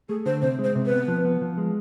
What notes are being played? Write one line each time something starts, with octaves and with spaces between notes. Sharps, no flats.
A3 G#4
D3 C5
C3 C5
G#3
C5
C3
B4
B3
F3
B3
F3
G#3